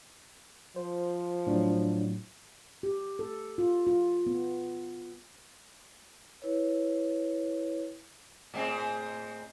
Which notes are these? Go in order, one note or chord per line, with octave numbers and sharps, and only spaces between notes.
F3 C5
A2 F#3 D4
G4
A4
F4
F4
B3
E4 B4 C#5
A2 G#3 C4